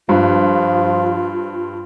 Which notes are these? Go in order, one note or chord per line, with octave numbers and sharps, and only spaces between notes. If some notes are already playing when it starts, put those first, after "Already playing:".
G2 F3 F4